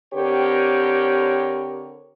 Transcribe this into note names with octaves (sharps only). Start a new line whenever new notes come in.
D3 C4 G4 A#4 C#5